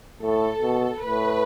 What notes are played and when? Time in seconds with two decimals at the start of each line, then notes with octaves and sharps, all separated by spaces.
0.22 A2 A4
0.62 B2
1.03 A2 B4